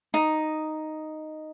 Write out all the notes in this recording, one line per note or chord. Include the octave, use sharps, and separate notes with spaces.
D#4